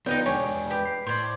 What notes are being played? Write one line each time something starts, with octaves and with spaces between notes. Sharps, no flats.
F3 B3 D#4 D5 D#5 G5
E2 G#3 D4 G4 C#5 G#5
G4 B4 B5
C7
A2 C5 D5 C6 G#6